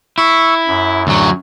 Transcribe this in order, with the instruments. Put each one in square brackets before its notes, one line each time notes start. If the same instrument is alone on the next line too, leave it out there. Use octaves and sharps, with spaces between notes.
[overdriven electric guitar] E4 [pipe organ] C#6 E6
[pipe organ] F#2
[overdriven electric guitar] D2 F#3